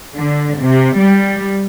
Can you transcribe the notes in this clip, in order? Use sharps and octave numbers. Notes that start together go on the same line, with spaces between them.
D3
C3
G3